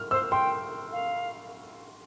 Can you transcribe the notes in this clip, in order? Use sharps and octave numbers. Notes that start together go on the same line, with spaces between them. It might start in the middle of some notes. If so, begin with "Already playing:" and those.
Already playing: F6
C5 E6
G5 C6
F5